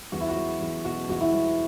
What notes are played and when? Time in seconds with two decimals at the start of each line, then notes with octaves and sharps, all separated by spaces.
0.12 E2 F#4
0.21 E4
0.29 F#4
0.36 F#3
0.61 E2
0.85 B2 F#4
1.09 E2 F#4
1.21 E4
1.33 F#3